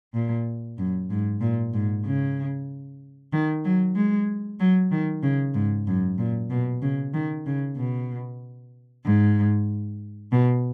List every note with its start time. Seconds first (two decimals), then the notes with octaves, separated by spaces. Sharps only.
0.14 A#2
0.78 F#2
1.10 G#2
1.41 A#2
1.74 G#2
2.05 C#3
3.32 D#3
3.64 F#3
3.96 G#3
4.60 F#3
4.91 D#3
5.23 C#3
5.54 G#2
5.87 F#2
6.18 A#2
6.50 B2
6.82 C#3
7.14 D#3
7.46 C#3
7.77 B2
9.05 G#2
10.32 B2